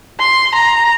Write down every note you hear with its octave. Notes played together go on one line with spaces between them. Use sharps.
C6
A#5